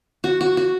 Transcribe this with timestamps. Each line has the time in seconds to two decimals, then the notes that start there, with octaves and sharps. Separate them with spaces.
0.24 F#4
0.41 F#4
0.57 F#4